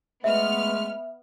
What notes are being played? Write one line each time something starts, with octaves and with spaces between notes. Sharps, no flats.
G#3 A3 B3 E5 F6